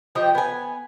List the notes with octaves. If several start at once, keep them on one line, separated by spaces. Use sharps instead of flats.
F3 G4 D#5 G5
B3 G#5